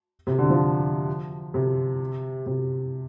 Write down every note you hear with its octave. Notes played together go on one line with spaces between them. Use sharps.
C3
D3
F3
C3
C3